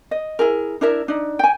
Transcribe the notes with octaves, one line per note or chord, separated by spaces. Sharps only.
D#5
E4 G#4 A#4
D4 E4 A#4 E5
D4 D#4
G5 G#5